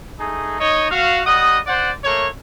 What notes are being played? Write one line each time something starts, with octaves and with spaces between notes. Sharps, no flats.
A3 D#4 G#4
D#4 C#5 D#5
F#4 F5
G3 D#5 F#5 D#6
C5 D5 F#5
A3 A#3 C#5